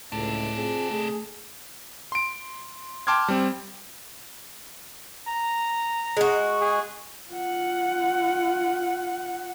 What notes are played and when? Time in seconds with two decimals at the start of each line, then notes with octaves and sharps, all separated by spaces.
0.12 C#2 A2 C3 D4
0.55 C4 F4 G#4
0.91 A3 G#4
2.12 C6 D7
3.07 G5 A5 C6 D6 F6 G#6
3.28 G3 C4
5.28 A#5
6.17 G#3 F#4
6.61 G#4
7.32 F4 F#5